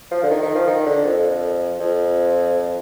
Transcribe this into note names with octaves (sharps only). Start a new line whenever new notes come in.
F3
D3
D#3
D#3
F3
D#3
D3
F2
F2